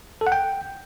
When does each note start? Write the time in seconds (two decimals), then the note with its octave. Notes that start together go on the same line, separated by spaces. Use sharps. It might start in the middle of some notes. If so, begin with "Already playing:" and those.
0.21 A4
0.27 F#5
0.32 G5